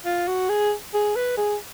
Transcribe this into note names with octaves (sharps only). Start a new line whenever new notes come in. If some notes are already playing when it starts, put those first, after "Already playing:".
F4
F#4
G#4
G#4
B4
G#4